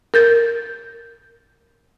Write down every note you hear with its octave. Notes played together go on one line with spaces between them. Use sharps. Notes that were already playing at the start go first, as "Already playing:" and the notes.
A#4 G6 A6